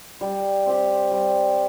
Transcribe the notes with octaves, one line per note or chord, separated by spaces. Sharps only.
G3
C4 G4
G3